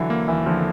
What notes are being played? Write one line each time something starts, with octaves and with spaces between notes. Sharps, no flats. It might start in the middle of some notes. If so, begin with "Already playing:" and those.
Already playing: D3 E3 F#3
A#3
D#2 E3
D3 F3